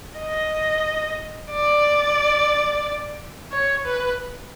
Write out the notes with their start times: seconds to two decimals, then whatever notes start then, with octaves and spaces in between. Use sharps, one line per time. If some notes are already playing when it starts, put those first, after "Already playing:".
0.18 D#5
1.51 D5
3.52 C#5
3.85 B4